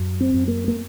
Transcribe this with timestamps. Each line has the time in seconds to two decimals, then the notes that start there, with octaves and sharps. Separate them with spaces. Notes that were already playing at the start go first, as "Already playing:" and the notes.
Already playing: F#2
0.20 C4
0.34 F#2
0.48 A#3
0.68 A#3